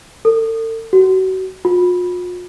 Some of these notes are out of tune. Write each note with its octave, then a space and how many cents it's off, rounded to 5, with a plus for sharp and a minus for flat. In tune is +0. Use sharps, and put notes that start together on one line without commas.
A4 +40
F#4 +30
F4 +45